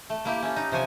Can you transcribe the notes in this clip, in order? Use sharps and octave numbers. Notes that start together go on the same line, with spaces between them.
A3
A#3 E4 G4
C#4 E4 A4
D#4
C3 F3 C#5 G#5